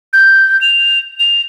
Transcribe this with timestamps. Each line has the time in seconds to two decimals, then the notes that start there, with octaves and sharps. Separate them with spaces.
0.13 G6
0.61 F7
1.20 F7